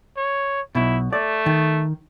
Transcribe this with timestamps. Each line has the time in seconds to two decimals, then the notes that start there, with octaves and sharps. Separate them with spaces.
0.17 C#5
0.75 B1 B2 E4
1.13 A3 D5
1.46 D#3